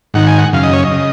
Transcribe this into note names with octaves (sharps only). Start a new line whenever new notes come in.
G#2 D#3 F#5
G#5
F#5
F#2 C#3 F5
D#5
C#5
D#5
C#3